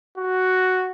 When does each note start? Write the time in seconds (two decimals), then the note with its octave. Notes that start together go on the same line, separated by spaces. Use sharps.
0.18 F#4